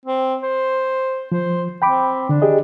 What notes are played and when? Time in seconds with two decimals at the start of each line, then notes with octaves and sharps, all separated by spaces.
0.05 C4
0.42 C5
1.32 F3 C5
1.82 C4 G5 B5 D6
2.29 D3 D4
2.42 G4 G#4 D#5